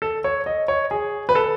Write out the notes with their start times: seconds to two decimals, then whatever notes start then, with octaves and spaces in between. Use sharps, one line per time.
0.02 A4
0.24 C#5
0.46 D#5
0.68 C#5
0.91 G#4
1.29 B4
1.35 A4